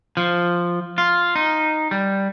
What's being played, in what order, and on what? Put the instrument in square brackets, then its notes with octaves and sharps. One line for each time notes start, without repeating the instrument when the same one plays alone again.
[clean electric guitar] F3
F4
D#4
G3